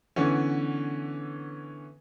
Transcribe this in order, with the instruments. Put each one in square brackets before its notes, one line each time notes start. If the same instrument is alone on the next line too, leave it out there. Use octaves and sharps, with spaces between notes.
[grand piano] D3 E3 B3 C#4